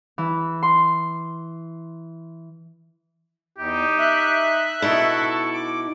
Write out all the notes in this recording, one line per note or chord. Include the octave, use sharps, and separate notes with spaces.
E3
C6
E2 D#4 G4
E5 F#6
B2 D#4 E4 A4 C#6
D6